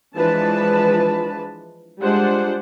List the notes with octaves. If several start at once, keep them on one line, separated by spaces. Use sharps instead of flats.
E3 F3 G#3 D4 B4 A5
G3 G#3 D4 F4 C5 F#5